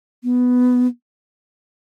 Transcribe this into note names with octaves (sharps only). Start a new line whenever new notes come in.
B3